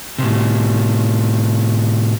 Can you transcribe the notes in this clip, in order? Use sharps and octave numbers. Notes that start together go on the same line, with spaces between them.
A2 C3